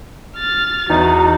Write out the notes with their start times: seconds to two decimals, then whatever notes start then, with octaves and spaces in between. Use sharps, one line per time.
0.37 F6 A6
0.90 E2 D#4 F#4